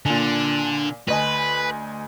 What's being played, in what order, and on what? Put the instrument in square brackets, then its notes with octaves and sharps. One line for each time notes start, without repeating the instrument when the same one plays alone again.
[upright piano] A#2 G#5 [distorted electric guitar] D3
[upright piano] D2 D#5 G#5 [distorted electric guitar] B4